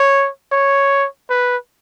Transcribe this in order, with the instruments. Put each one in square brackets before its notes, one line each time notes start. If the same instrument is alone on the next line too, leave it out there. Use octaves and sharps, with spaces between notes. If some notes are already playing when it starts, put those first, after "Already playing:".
Already playing: [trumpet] C#5
C#5
B4